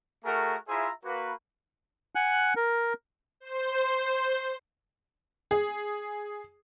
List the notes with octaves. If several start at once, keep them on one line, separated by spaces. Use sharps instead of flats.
A3 F#4 G#4 A#4
E4 F4 G#4 C5 E5 A#5
A#3 F#4 B4
F#5 G#5 F#6
A#4
C5
G#4